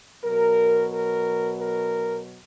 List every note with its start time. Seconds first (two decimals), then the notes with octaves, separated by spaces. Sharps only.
0.22 B2 F#3 A#4
0.91 A#4
1.57 A#4